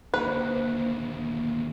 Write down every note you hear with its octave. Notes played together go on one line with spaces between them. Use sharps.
D#2 D3 A#3 B4 C5